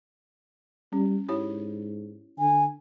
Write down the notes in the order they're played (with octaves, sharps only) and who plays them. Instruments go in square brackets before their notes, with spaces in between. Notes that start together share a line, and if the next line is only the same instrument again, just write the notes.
[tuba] G3 [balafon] C#4
[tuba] G#2 [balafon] E4 G4 C#5
[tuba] D3 [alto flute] G#5